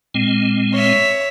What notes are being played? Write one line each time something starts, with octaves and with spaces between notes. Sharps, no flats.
A#2 G#3 C4
C#5 E5